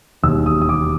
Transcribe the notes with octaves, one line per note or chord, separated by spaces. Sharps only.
E1 D#2 D#3 G3 E6
D#6
D#6
D6